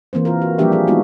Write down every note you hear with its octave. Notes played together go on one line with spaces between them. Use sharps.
E3 A#3 C4 C5
F4 A#4
F#4
F3 G3 A#3 D4 G4 E5
G4 G#4
G#3 B3 D#4 F4 F#4